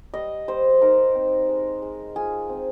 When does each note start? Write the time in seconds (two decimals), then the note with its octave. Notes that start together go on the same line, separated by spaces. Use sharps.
0.14 G3 D#5
0.48 G3 C5
0.81 D#4 A#4
1.15 C4
1.49 G#3
1.82 G#3
2.16 F4 G#4
2.49 C4